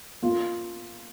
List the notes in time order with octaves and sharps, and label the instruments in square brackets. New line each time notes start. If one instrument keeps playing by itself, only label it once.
[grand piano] A#3 F4